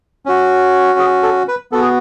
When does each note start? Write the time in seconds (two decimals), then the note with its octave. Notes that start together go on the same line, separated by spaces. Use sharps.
0.26 C#4 F#4
0.99 G#4
1.23 A4
1.48 B4
1.72 B3 F#4 A4
1.81 G#4